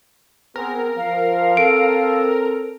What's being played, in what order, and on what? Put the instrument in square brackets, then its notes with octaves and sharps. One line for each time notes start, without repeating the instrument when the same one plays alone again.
[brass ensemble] B3 C4 G#4 [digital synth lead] A#4
[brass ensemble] F3 [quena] F5
[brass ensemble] C4 A4 [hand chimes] D7